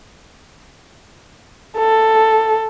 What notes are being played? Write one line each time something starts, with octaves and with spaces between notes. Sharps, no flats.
A4